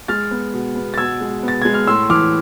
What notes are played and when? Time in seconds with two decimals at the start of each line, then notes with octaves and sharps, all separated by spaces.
0.08 G#3 F6 A6
0.31 B3
0.54 B2
0.76 B3
0.94 A6
0.98 B2 E6 G#6
1.21 G#3
1.43 B3 A6
1.62 G#3 G#6
1.74 F6
1.87 A2 C6 E6
2.10 E3 D6 F6